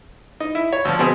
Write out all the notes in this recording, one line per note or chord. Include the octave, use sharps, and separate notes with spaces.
D#4
E4
C#5
D2 F3
B2 B3 C4 G#4